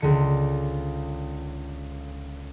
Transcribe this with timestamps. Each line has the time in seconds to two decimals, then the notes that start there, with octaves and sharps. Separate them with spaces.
0.01 C#2 D3 C#7